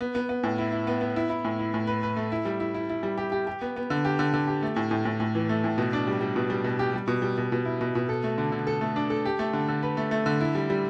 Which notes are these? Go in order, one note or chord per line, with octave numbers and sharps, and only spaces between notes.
B3
B3
B3
A2
E4
E4
B3
B3
E4
E4
A2
E4
A2
B4
B4
A3
E4
G3
E4
E4
E4
G3
G4
G4
G4
B3
B3
D3
G4
D3
D3
G4
A3
A2
A2
A2
A2
E3
A3
A2
B2
D4
G3
G3
B2
G3
B2
G4
G3
B2
G3
B2
B2
E4
B2
B2
A4
A3
D3
D3
A4
A3
D4
A4
G4
A3
D3
D3
B4
A3
A3
D3
E4
G3
G3